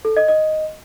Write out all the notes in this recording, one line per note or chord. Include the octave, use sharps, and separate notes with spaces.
A4
D#5
D#5